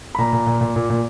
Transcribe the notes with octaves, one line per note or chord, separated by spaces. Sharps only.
B5
A#2 A#5
A#2
A#2
A#2
A#2
A#2